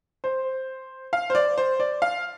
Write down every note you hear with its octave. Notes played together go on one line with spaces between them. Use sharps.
C5
F5
C5
D5
C5
D5
F5